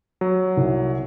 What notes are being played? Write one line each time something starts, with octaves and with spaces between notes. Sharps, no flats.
F#3
C2